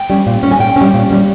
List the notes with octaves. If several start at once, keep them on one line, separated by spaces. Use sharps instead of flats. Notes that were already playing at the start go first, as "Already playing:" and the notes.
Already playing: G5
G3 C#4
A#2
G3 C#4
G#5
A#2 G5
G3 C#4
A#2
G3 C#4